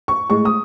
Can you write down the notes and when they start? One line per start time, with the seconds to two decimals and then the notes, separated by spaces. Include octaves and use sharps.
0.08 C#6
0.30 A2 G#3 C#6
0.45 D#6